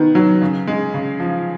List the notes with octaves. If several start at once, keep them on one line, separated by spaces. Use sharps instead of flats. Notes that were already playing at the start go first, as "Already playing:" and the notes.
Already playing: D#3 B3
F#3
C#3
G#3
C#3
F3